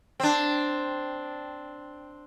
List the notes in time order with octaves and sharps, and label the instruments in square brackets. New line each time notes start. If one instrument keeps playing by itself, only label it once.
[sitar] C4 D4